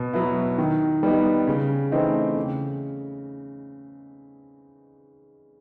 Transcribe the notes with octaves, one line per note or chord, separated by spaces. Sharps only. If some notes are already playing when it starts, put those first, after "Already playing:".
Already playing: B2
F#3 B3 E4
D#3
G3 B3 D#4
C#3
E3 A3 C4 D#4
C#3